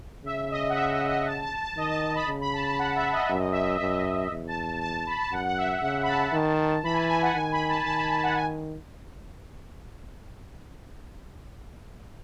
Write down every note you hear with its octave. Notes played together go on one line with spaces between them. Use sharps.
C#3 E5
D#5
F#5
E5
D#5
D#5
A5
A5
A5
D#3 D#5
A5
A5
B5
C#3
B5
A5
A5
F#5
E5
D#5
F#2 E5
D#5
E5
D#5
F#2 E5
D#5
E2
A5
A5
A5
B5
A5
F#2 F#5
F#5
E5
C#3 F#5
B5
A5
D#3
E3 B5
G#5
A5
G#5
F#5
D#3 G#5
B5
A5
D#3 A5
B5
A5
F#5
G#5